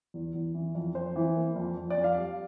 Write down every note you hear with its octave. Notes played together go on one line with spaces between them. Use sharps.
E2
E2
E3
F2
F2 C5
E3
A#3
F2
F2
D5
F2
F5
G3